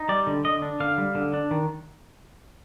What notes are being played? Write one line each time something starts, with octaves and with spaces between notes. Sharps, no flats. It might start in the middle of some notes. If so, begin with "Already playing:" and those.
Already playing: D#4
G3 D5
D3
D3 D#5
D4
D3 F5
G3
D3
D4
D#3